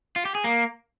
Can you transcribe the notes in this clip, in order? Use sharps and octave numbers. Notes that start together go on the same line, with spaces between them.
F4
G4
G#4
A#3